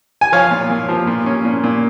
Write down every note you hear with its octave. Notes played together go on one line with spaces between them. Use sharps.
G#5
F3 C#5 F5
A#2
A#2
F3
A#2
C#4
A#2
A#2